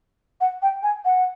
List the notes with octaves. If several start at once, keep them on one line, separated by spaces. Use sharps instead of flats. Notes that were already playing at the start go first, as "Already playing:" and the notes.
F#5
G5
G#5
F#5